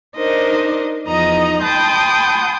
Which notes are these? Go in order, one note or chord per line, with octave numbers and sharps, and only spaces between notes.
D4 D#4 A#4 C5 D#5
E2 F3 D#4 D#5 A#5 D#6
G5 A5 B5 C6 D#6 G6